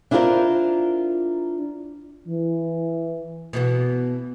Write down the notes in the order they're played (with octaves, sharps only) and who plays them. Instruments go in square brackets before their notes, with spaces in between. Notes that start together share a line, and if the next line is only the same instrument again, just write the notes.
[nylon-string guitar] D4 E4 F4 G#4 A#4 C5
[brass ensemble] E3
[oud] B2 E3 B3